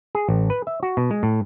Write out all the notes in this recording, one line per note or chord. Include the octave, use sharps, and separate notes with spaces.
G#4
A1
B4
E5
F#4
B2
G#3
A2